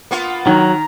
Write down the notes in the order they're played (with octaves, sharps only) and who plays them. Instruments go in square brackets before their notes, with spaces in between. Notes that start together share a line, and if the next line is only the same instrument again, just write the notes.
[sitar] A#3 B3 F4
[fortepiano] D#3 [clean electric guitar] F#3 [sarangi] A#5